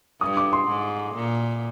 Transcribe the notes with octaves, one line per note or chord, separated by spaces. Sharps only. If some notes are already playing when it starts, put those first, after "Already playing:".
G2 D#6
D6
C6
G#2
A#2